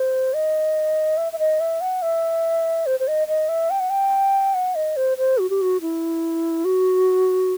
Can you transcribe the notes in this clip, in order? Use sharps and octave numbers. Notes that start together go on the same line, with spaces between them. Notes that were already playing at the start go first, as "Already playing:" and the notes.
Already playing: C5
D#5
E5
E5
D#5
E5
F#5
E5
C5
C5
D#5
D#5
E5
G5
F#5
G5
F#5
D#5
C5
C5
F#4
G4
F#4
E4
F#4